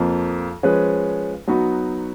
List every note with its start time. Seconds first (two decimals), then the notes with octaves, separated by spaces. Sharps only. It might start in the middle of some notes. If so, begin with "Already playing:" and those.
Already playing: F2 F3 A#3
0.63 F3 G#3 C#4 G#4 B4
1.47 F#3 B3 D#4 F#4